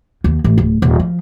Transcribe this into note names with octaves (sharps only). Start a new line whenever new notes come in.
D#2
A1
D1
D#1
F3